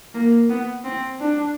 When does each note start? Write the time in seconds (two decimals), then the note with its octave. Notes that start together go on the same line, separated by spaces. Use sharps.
0.14 A#3
0.49 B3
0.84 C4
1.20 D4